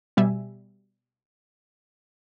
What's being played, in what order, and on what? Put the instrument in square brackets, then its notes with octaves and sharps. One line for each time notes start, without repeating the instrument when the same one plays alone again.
[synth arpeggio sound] B2 G3 E5 G#5